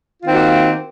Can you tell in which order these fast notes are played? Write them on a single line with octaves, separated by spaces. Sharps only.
F4 D#3 C4 A#3 F#4